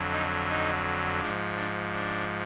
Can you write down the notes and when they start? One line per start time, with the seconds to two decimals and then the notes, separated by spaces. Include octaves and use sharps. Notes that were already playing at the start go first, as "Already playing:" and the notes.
Already playing: F2 D3 F#3
0.11 D#4
0.49 D#4
1.20 G#2 F3 D4
1.56 D4
1.92 D4